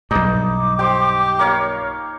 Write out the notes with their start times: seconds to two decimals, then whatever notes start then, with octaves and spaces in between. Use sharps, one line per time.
0.11 B1 G2 D#4 D6
0.79 G4 C5 G5
1.39 A#3 C#5 F5